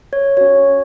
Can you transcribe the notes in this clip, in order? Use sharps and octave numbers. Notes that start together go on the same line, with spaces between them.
C#5
C#4 F#4 C#5